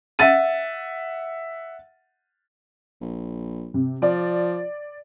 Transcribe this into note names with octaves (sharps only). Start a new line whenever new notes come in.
E5 F#5 A6 D#7
A#1
C3
F3 D5